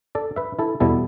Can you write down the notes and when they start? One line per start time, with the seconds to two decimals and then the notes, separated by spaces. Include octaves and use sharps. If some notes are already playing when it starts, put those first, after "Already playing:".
0.15 A4 D5
0.36 B4 E5
0.59 E4 A4
0.80 E2 B2 G3 B3 E4 A4